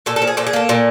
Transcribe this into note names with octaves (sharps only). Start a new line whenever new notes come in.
A#2 A4
A4
F3
G#4
A#2 A4
G#4
A#3 A4
A#2